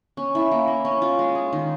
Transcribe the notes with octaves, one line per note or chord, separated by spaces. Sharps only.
C#4
E4
A#3
A#3
C#4
F4
G#3
G#4
D#3